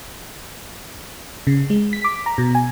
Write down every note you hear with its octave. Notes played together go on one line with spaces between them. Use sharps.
C#3
G#3
B6
D6
A#5
B2
G#5